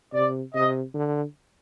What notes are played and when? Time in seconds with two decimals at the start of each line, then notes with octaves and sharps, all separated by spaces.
0.13 C3 D5
0.54 C3 D#5
0.94 D3